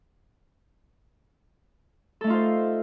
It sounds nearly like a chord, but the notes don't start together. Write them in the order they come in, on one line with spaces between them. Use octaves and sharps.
A4 A3 D#4 F4 C5